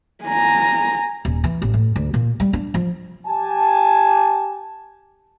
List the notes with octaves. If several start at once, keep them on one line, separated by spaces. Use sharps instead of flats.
G#5 A#5
D#1
E3
A1
A2
D2
A#2
G3
D4
F3
G4 G#5 A5